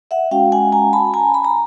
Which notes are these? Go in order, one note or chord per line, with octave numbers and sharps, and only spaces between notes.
E5 F#5
G#3 C#4 F#4 F5 G5
F#5 G#5
G#5 A#5
A5 B5
G#5 A#5
B5
A#5